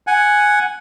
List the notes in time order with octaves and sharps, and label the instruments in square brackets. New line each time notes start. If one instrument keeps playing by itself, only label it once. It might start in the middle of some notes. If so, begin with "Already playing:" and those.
[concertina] F#5 G#5